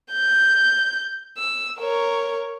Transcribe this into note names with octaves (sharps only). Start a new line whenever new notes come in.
G6
E6
A#4 C#5